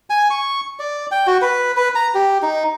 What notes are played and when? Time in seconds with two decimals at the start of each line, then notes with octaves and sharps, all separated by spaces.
0.10 G#5
0.30 C#6
0.79 D5
1.11 G5
1.27 F#4
1.42 B4
1.77 B4
1.95 A#5
2.15 G4
2.42 D#4